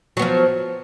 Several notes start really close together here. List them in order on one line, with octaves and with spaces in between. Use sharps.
F#3 B3 F3